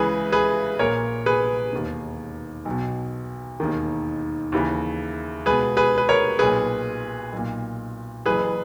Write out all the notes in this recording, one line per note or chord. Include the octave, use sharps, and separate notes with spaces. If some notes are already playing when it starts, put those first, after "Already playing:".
Already playing: C#2 C#3 E3 G#4 B4
G#4 B4
A#1 A#2 A#4 C#5
G#4 B4
E1 D#2 D#3
B1
B2
E1 D#2 D#3
D#2 C#3 E3
C#2 B2 G#4 B4
G#4 B4
B4
A#4 C#5
B1 A#2 G#4 B4
B1 A#2
F#1 F#2 E3 G#4 B4